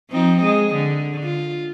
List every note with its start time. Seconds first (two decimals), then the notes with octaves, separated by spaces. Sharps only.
0.10 F3 C4 D#4
0.43 G#3 D#5
0.75 D3
1.23 F4